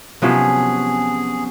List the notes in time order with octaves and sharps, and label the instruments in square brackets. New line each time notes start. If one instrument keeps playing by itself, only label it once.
[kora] C3 F3 F#3 [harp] B3 C#4 [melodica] G#4